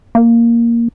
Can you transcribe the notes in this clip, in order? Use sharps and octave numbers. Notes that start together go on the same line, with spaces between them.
A#3